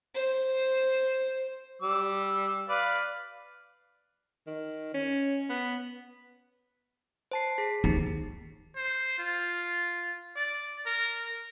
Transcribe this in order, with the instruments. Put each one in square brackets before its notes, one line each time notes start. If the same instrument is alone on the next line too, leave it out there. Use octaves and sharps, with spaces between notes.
[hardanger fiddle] C5
[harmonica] G3 D6 E6
B4 D5 F5
[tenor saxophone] D#3
C#4
B3
[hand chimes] C5 A5 C7
G#4 B6
[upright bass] D#2 [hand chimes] D#4 G4
[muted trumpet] C5
F4
D5
A#4